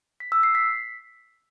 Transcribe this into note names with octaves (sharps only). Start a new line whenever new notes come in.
B6
E6
C7
B6